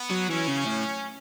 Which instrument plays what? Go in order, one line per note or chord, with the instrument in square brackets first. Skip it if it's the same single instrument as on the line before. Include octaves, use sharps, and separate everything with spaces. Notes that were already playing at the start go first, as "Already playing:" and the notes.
Already playing: [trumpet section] B3
[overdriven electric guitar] F#3
[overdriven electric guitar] E3 [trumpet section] C#4
[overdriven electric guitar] C#3
A2